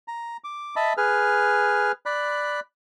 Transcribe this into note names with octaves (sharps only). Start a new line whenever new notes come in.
A#5
D6
D#5 E5 A5 B5
G#4 B4 F6
D5 B5 F#6